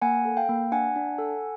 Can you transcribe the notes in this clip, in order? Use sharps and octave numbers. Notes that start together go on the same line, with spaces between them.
A#3 F#5 G#5
A4
F5 G5
A#3
D4 F#5 G#5
D4
A4